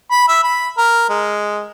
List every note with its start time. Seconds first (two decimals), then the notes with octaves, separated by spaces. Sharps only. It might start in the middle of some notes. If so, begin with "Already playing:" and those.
0.11 B5
0.28 E5
0.44 B5
0.78 A#4
1.09 G#3